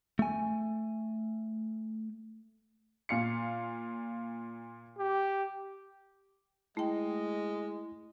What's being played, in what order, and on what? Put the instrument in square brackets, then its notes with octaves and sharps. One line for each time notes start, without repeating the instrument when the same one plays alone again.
[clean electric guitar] A3 G#5
[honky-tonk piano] A#2 F5 C#7
[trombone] G4
[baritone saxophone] G#3 [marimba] A3 G5 [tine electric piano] E4 [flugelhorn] D#5